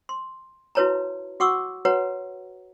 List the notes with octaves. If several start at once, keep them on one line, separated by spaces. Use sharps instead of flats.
C6
E4 F#4 B4 C#5 A5 A#5
F#4 F#5 C#6 D6 E6
F#4 B4 C#5 F#5 A#5